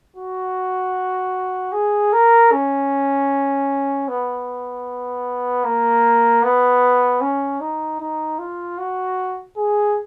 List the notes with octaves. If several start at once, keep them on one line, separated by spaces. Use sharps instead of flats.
F#4
G#4
A#4
C#4
B3
A#3
B3
C#4
D#4
D#4
F4
F#4
G#4